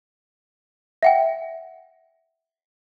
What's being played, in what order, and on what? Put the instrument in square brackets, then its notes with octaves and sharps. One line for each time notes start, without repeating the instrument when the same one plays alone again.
[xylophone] E5 F#5 G5